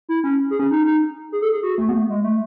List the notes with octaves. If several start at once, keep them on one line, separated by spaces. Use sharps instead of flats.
E4
C#4
G#4
C#4
D#4
D#4
G#4
A4
G#4
F#4
A3
B3
A3
G#3
A3